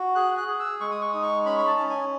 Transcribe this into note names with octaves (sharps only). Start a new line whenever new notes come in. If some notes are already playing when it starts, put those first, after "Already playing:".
Already playing: F#4
G#4 F#6
F#6
G#4
E6
G#3 C#6
D#6
C#6
D#4 D#6
C#6
C#4 B5
B5
A5
C#4
G#5